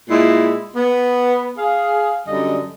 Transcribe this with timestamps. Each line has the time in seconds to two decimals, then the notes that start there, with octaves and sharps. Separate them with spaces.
0.09 A#2 G#3 E4
0.75 B3
1.58 G#4 F5
2.26 F#2 D3 G3 D#5